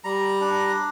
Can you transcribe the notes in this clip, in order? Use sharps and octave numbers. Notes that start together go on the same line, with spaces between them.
G3 A#5
D4